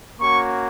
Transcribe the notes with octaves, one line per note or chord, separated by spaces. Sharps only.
A#3 C#4 F#4 C#6